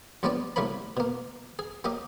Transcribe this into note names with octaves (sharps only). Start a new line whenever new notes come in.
A#1 G3 G#3 B3 C#5 D5
C2 F#3 A3 A#3 C#5 B5
B2 A#3
G#4
F#3 A#3 G4 D#5